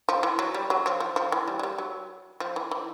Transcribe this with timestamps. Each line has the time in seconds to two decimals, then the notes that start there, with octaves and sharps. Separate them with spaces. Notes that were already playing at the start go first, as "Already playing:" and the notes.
0.09 F3
0.23 E3
0.39 F#3
0.54 G3
0.70 F#3
0.86 F3
1.00 F3
1.16 F3
1.32 E3
1.48 G3
1.59 F#3
1.63 G3
1.78 F#3
2.40 F3
2.56 E3
2.71 E3